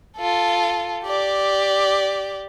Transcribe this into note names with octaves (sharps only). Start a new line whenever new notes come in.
F4 A4
G4 D5